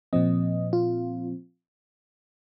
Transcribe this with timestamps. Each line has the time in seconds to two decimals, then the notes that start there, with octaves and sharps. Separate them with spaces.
0.13 A#2 F3 C4 D#5
0.73 F4